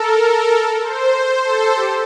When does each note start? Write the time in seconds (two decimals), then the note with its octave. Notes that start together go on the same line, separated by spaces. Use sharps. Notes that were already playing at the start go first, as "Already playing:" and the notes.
Already playing: A4 A#4
0.22 A#4
0.53 A4
0.83 C5
1.13 C5
1.44 A4
1.75 G4